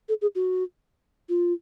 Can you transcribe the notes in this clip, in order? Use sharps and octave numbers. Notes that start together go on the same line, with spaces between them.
A4
G#4
F#4
F4